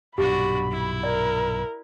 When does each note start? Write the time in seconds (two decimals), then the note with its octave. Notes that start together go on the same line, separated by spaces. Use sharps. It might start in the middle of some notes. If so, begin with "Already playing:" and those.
0.18 B1 G2 A#2 D4 F#4 G4 B5
0.71 E4
1.03 A#4 D5